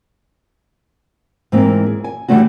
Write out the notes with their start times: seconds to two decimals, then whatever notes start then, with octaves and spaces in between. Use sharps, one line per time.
1.52 G#2 E3 A#3 C4
1.86 G#4
2.04 G#5
2.28 D3 E3 G3 A3 C#4 F#4